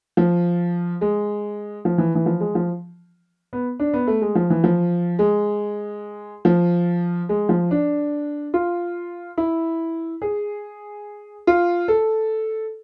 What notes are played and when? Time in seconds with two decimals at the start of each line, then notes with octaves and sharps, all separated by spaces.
0.17 F3
1.01 G#3
1.85 F3
1.98 E3
2.15 E3
2.26 F3
2.40 G#3
2.55 F3
3.53 B3
3.80 D4
3.94 B3
4.07 A3
4.22 G#3
4.35 F3
4.50 E3
4.64 F3
5.19 G#3
6.45 F3
7.29 G#3
7.49 F3
7.71 D4
8.54 F4
9.38 E4
10.22 G#4
11.47 F4
11.88 A4